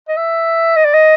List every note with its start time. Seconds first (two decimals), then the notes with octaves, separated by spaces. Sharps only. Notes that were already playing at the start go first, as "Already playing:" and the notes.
0.08 D#5
0.17 E5
0.76 D#5
0.85 D5
0.94 D#5